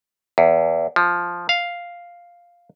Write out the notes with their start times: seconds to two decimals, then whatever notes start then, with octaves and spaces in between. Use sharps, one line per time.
0.38 E2
0.96 F3
1.49 F5